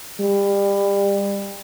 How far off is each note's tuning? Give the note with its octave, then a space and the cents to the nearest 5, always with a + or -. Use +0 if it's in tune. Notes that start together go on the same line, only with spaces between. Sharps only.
G3 +25